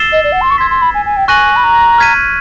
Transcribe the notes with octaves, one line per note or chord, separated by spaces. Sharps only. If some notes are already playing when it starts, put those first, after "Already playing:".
Already playing: E6 A6 C7 E7 G7
D#5
D5
F#5
C6
C#6
C6 E6 G#6 B6
C6
B5
G#5
G#5
G5
G#5 C#6 F#6 A#6 D#7 F#7
B5
A#5
F6 G#6 B6 D#7